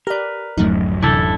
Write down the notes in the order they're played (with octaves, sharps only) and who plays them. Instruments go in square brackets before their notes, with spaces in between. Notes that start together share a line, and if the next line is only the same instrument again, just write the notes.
[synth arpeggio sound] G4 D5 [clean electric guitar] A#4 B4
[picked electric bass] D1 F#2 [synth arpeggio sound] F3 F#3 A3 [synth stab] D#4
[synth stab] C3 E3 [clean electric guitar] D4 E4 A4 [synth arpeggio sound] G6